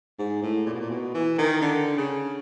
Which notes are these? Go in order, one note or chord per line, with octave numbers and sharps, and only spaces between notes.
G#2
A2
A#2
B2
A#2
B2
E3
D#3
D3
C#3